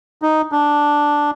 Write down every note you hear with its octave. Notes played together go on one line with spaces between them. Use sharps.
D#4
D4